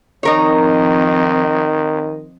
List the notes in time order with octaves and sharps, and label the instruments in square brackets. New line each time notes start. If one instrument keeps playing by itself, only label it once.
[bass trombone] D#3 [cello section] F3 C4 D#5 [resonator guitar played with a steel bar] D#4 A#4 C#5